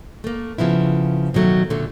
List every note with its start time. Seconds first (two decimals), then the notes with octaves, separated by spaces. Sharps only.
0.24 A3 A#3
0.58 C#3 F3 B3 E4
1.34 B2 D#3 F#3 A3
1.70 A#2 D3 A3